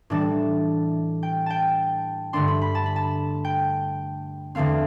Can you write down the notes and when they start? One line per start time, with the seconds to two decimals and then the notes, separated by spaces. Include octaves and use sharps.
0.10 A2 E3 G3 D4 A5
1.23 G5
1.46 G5 A5
2.33 G2 D3 A3 D4 C6
2.48 B5
2.61 B5
2.75 A5
2.86 B5
2.96 A5
3.44 G5
4.55 E2 D3 A3 C4 F5